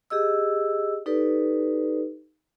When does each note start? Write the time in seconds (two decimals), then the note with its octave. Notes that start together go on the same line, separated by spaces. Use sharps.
0.10 G4 G#4 D#5 E6
1.06 D#4 G4 A4 B4 D5